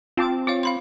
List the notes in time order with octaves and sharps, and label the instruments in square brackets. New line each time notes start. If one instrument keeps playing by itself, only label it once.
[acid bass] C4 [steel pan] F4 A5 D6
[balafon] F4 C#5 F5 [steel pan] D6
[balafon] F5 B5 C6